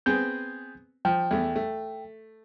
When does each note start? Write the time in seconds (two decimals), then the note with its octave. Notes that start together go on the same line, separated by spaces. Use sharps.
0.06 B3 C4 G#4 G6
1.05 F3 G5
1.31 E2 A3
1.56 A3